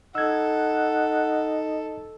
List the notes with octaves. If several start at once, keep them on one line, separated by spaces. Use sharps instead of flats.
D#4 A4 F#5 E6 G#6